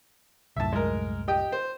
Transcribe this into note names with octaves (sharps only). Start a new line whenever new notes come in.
C2 F#2 A2 E5 A5
G#3 A#4
G4 D#5 G5
C5